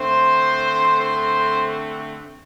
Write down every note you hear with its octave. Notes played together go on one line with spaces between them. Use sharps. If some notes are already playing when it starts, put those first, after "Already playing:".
Already playing: D3 A3 C4 C5
C5